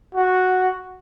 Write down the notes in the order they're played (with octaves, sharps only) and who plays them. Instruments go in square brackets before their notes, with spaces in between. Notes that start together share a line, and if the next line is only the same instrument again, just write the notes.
[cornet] F#4